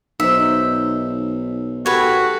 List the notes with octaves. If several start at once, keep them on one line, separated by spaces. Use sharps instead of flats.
B1 D#4 C5 E5
F#4 G4 A4 B4 C#5